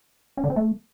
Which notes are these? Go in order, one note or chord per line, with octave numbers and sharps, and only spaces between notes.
C#4
D3
C4
A3